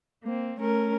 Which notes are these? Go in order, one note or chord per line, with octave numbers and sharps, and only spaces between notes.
A#3 C4
A3 C#4 A#4